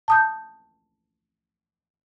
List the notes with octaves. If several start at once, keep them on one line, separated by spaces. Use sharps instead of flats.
A5 D#6 G6